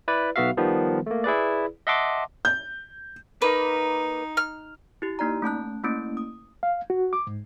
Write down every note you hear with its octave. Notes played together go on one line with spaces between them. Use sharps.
E4 B4 D5
B1 B3 F#4 E5 F5
D#3 F3 G3 B3
A3 A#3
E4 G#4 B4 D5
D#5 E5 F#5 A5 C6 D6
G6
A#3 D#4 B4
F6
E4 G4
A#3 D#4 D5 A#5
A3 C#4 A5 F#6
A3 A#3 C#4 E4 D7
D#6
F5
F#4
D6
G#2